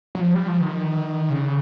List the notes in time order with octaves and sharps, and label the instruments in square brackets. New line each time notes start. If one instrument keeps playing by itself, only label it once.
[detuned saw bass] F#3
F3
G3
F3
D#3
C#3